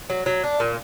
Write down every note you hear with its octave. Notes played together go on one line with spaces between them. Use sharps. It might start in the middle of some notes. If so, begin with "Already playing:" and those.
F#3
F#3
D4
A#2